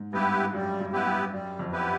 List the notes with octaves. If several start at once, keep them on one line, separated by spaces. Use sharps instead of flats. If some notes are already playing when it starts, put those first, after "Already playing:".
Already playing: G#2
G2 B3 E4 G4 B4
F#2 G3
F#2
B3 E4 G4 B4
G2
F#2 G3
F2
B3 E4 G4 B4